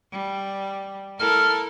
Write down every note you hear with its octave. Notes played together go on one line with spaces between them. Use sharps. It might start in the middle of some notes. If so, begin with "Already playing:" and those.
G3
E4 A4 A#4 F6